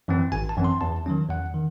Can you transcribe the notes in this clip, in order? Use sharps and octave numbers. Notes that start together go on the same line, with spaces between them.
F#2 E3 C4
G#1 G#5
A5
F#2 E3 C4
C6
E2 A5
D#3 F#3 C#4
E2 F#5
D#3